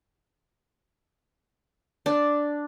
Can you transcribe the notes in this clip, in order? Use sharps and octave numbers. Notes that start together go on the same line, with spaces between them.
D4